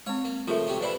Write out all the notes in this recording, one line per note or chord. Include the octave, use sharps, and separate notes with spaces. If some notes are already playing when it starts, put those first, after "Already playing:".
G#3 C4 C#5
A#3
C#3 F3 A3 F4 A#4 E5
C3 G3 C#4
F2 D4 E4 B4 D5 B5